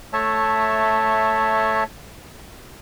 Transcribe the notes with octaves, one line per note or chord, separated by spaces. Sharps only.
A3 C#5 E5 A5